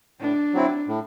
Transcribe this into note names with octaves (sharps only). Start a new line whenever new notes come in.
A2 D4
F#3 C4 E4
A2